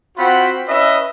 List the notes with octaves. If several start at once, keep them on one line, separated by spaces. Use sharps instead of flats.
C4 F4 F#4 C5 F#5 B5
C#4 E4 B4 D#5 E5